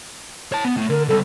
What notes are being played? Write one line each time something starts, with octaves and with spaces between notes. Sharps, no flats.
C#5 A5
B3
A2
D3 A#4
C#2 G3 A4